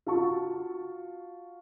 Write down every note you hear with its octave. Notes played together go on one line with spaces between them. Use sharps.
F4 F#4 A5 C#6